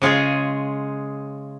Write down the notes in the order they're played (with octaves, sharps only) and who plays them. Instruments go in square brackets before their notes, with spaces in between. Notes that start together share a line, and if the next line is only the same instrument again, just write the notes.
[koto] C#3 G#3 C#4 F4 G#4